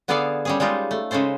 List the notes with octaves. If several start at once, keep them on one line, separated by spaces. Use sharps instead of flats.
D3 B3 G#4 A4 D5 F5
G3 C#4 G#4
G3 G#3 D#4 F4 A#4
A3
C#3 G#3 C#4 A4 C5